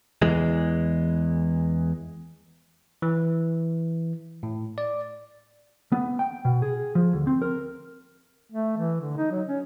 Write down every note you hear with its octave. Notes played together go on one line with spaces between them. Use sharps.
E2 E3 G#3
E3
A2
D5
B3
G5
B2
G#4
F3
D2
C4
A#4
A3
E3
D3
D#4
F#3
C#4